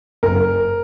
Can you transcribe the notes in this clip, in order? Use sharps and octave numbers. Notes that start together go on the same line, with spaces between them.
F#1 A#4